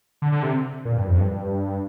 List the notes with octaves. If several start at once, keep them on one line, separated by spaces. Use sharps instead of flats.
D3
D3
C3
A#2
G2
F2
G2